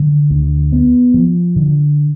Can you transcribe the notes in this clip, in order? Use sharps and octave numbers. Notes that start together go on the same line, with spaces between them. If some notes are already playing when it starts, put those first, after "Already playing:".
Already playing: D3
D2
B3
F3
D3